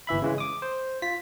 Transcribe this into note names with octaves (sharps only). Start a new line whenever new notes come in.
G1 E3 E5 B5
C#3 E3 G#3
D6 D#6
C5
F4 B6